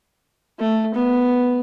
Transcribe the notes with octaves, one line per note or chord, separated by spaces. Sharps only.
A3
B3